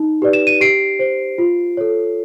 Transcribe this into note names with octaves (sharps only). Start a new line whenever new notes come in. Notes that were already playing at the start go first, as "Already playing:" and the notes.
Already playing: D#4
G4 B4 D5
E7
D#7
G4 C7 D7
C5
F4
A4 C#5